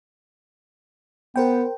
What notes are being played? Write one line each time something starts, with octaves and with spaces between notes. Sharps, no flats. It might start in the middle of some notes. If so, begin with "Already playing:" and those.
B3 A#4 C5 G5